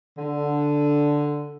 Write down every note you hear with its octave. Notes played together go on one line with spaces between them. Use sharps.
D3